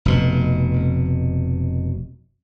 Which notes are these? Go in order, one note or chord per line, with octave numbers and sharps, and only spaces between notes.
F1 B2